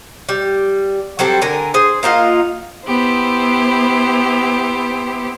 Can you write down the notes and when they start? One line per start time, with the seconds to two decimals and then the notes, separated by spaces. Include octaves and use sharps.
0.29 G3
1.19 F#3 G3 C4 A4
1.42 D3 A#4 G#5
1.74 G#4 C5
2.03 A#3 D#4 F4 F#5
2.87 B3 E4 G4 C5